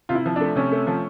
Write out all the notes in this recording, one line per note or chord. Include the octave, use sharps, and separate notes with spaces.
C3 F4
E4
F3
A3 D4
C3 C#4
A3
F3